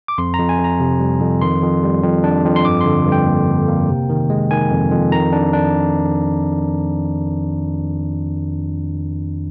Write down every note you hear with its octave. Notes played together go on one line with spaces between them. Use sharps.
D6
F2 C6
F2 A#5
G#5
F2
A#5
C3
G3
F2
D#3 C6
F2
G3
F2
D4
F2
C6
G2 D6
D3 C6
G2
G5
A#3
D3
A#3
C3
D#3
G#3
D#3 G#5
F2
F2
D#3 A#5
D4
D4